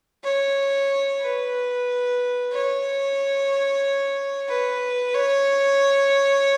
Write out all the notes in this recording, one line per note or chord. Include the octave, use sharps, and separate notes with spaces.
C#5
B4
C#5
B4
C#5